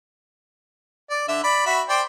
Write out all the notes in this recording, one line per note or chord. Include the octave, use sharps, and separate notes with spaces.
D5
D3 E5
D5 B5
F#4 E5 B5
C5 D5 G5